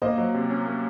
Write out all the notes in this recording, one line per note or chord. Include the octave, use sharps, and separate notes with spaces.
A#3 C5 D#5
F#3
C3
C#4
A#3